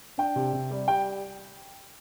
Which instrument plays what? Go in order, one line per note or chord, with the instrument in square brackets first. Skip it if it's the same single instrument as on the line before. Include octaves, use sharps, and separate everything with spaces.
[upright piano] D4 [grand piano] G5
[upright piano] C3
C3
G3
[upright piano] G3 [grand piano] G5